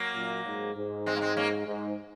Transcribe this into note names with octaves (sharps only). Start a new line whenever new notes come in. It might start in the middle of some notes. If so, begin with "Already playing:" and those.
Already playing: F#3 A#3
F#2 A#2
G#2
G#2
G#3 C4
A#3
G#3 C4
A#3 C#4
G#2